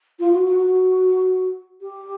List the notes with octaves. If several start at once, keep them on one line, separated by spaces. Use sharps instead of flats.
F4
F#4
F#4
F#4
G4